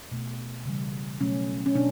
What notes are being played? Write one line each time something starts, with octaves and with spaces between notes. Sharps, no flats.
B2 A3
C#3 E3 G3
B2 F#3 A3 C#4
C#4
B2 D4